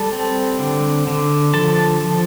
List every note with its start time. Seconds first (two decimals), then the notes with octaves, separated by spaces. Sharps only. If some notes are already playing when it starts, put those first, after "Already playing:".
Already playing: G3 A4 A5
0.12 C4
0.59 D3
1.07 D3
1.54 F3 A4 A5
2.01 F3